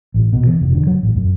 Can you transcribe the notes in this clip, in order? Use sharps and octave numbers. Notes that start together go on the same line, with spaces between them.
A1
B2
E3
F1
D3
F#3
A1
F#2